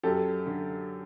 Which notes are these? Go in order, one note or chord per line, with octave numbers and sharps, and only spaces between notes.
F#2 G4 A4
D3